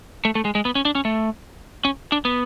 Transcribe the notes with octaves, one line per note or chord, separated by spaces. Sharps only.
A3
A3
G#3
G#3
B3
C#4
D4
C#4
A3
C#4
D4
B3